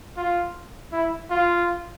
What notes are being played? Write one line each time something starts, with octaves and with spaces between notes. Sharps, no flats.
F4
E4
F4